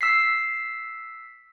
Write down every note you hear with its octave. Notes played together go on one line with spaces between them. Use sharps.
E6 B6 C7